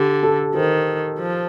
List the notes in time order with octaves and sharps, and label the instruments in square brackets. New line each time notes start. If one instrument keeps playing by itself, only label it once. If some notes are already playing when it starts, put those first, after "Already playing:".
Already playing: [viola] D3 [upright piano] G4
[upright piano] A4
[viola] D#3 [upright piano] C5
[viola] F3